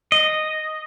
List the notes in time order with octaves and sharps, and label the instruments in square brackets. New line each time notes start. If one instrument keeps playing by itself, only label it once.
[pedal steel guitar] D#5